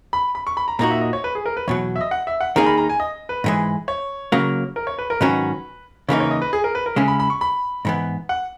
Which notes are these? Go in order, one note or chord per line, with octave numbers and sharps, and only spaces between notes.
B5
B5
C#6
B5
A#5
A#2 A#3 D#4 F#4 A#5
E5
D#5
C#5
B4
G#4
A#4
B4
E2 B2 F#3 C#5
E5
D#5
F#5
E5
F#5
D#3 A#3 D#4 G#4 A#5
B5
A#5
G#5
D#5
B4
G#2 E3 G#3
C#5
C#3 F#3 A#3
A#4
C#5
B4
A#4
G#2 D#3 F#3 C#4 F#4 B4
C#3 E3 A#3 D#4 C#5
C#5
D#5
B4
G#4
A#4
B4
A#4
C#3 G#3 C#4 E4 G#5
B5
B5
C#6
B5
G#2 E3 B3
F#5